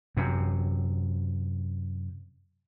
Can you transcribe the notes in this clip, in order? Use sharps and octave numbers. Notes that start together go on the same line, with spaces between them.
F#2 C3